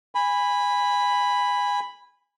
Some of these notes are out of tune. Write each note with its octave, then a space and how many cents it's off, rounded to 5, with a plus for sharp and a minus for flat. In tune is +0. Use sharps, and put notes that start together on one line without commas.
G#5 -20 B5 +0